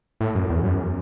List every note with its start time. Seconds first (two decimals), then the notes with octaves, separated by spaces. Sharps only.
0.21 A2
0.35 F#2
0.50 E2
0.64 F#2